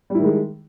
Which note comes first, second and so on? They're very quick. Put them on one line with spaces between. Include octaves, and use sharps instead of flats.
G3 E4 D#3 G#3